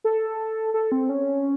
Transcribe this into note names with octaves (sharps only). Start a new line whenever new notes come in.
A4
A4
C4
C#4